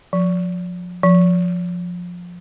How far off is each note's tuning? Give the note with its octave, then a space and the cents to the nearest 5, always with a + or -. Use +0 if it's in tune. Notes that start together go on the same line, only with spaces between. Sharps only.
F3 +30
F3 +15